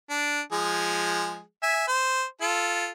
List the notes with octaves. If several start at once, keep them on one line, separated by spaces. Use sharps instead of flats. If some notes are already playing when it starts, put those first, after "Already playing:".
D4
F3 G#3 G#4
E5 G#5
C5
F4 A4